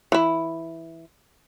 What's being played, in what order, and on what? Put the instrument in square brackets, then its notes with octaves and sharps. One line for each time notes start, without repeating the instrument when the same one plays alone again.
[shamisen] E3 E4